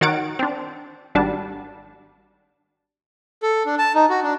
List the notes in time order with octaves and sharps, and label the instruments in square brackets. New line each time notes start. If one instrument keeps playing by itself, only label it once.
[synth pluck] D#3 F#4 C#5 F#5 A6 D7
C4 D4
G#1 G3 D4 F#4 A5
[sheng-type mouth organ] A4
D4
A5
D#4
F#4
D4